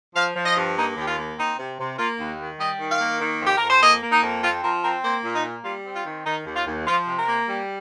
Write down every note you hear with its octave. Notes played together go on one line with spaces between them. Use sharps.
F3 F5
F3
D#5
G2
A#3 D#4
D#2 G4
F4
A#3
C4 D#4
C3
C3
A#3 F4
D#2
D#3
G3 D#5
D#3
F5
A#3
D#3
F2 G4
F2 A#4
C5
A#3 D#5
A#3
D#4
F2
C4 F4
F3 A#4
C4 A#4
A#3 C5
A#2
D#4
A#3
G3 F4
C4
F4
D#3
D#3 D#4
D#2
F4
D#2
F3 F4
C3
A#4
A#3
G3